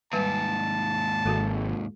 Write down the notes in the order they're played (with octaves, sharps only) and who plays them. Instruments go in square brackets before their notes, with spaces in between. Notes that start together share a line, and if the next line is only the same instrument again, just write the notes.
[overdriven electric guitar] D#2 G#2 [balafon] G3 B4 [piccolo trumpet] A5
[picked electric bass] G#1 [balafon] G#3 F#4 A4